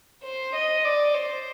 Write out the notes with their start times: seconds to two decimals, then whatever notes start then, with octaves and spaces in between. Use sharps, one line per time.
0.24 C5
0.54 D#5
0.85 D5
1.15 C5